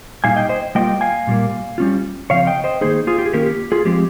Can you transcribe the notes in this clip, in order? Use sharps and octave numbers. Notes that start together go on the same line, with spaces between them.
A#2 G3 A#3 D#4 F5 G#5
D#5 G5
C5 D#5
G3 A#3 F4 D#5 G5
F5 G#5
A#2 G3 A#3
G3 C#4 F4
C#3 F3 C4 C#5 F5
D#5 G5
C5 D#5
D#3 A#3 D#4 G#4 C5
F4 G#4
G4
G#4
D#3 A#3 C#4 F4 G4 A#4
G4
F4 G#4
F3 G#3 C4 G4